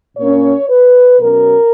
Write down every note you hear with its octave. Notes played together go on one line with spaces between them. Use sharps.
A#2 A#3 C#4 C#5
B4
B2 F#3 C#4 A#4